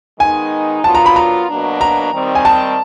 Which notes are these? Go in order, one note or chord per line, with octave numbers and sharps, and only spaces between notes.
D#3 G#3 B3 D#4 G#5
F#3 B3 D4 F4 A#4 A5
A#5
B5
A#5
B2 F#3 A#3 D4
A#5
D#3 G3 C4
G#5
A5